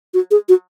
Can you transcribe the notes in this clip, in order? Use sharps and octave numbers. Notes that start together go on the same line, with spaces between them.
F#4
G#4
F#4